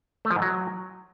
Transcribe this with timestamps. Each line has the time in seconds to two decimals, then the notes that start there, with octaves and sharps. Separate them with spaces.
0.25 A3
0.31 F3
0.36 G#2
0.42 F#3